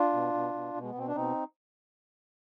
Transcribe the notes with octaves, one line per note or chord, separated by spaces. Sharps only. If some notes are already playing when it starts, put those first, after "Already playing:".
Already playing: D4 F4
B2
B2
B2
B2
G#3
B3
B2 C4
D4
B2 C4 D#4